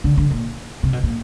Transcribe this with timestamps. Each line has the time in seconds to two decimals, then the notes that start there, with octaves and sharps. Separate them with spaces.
0.04 D3
0.17 D3
0.31 A#2
0.83 C3
0.93 B2
1.03 A#2